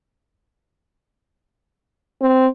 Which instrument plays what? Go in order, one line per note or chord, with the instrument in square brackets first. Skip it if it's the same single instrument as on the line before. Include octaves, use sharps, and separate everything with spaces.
[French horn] C4